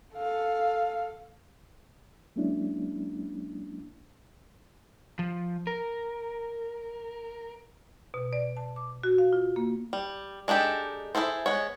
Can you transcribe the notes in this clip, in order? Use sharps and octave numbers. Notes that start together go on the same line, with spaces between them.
A4 F5
F#3 G#3 A#3 C#4 D4 E4
F3
A#4
B2
D5
A5
D6
F#4
F5
F4
A#3
G3
G#3 D4 D#4 G4 A4
E4 F#4 G#4 A4 C5
G#3 B3 C#5